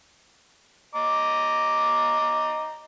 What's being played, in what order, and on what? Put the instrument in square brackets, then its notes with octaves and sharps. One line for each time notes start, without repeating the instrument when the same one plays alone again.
[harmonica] D#5 A#5 D6